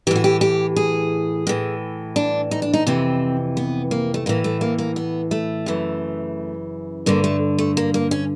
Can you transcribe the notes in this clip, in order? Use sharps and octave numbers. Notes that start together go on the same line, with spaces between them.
A2 E3 F#4 G4
G4
G4
G#4
A2 E3
D4
D#4
D4
D#4
F2 C3 E3 C4
B3
A#3
A3
A2 E3 A#3
A3
A#3
A#3
B3
A3
F#2 C#3 E3
G2 D3 A#3
A3
A3
A#3
A#3
C#4